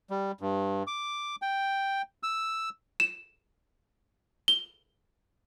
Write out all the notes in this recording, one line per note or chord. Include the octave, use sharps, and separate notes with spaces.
G3
G2
D6
G5
E6
E7
G7